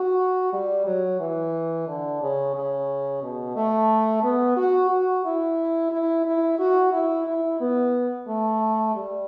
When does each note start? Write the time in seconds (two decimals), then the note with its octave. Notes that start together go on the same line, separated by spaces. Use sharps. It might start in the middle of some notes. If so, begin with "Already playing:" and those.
Already playing: F#4
0.53 G3
0.86 F#3
1.20 E3
1.87 D3
2.21 C#3
2.55 C#3
3.23 B2
3.56 A3
4.23 B3
4.57 F#4
4.91 F#4
5.25 E4
5.92 E4
6.25 E4
6.59 F#4
6.93 E4
7.27 E4
7.60 B3
8.28 A3
8.95 G3